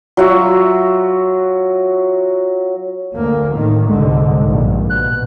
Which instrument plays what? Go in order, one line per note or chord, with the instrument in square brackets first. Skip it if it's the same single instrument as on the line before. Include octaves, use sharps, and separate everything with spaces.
[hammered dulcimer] F#3 F4 F#4 E5
[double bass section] D2 A#3
A2 D#3
[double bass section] C2 G#2 D3 [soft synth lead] G#3
[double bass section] A#1 G2
[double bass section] B2 [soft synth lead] F#6